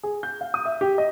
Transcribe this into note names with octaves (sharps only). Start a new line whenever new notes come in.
G#4
G6
F5
D#6
E5
G4
D#5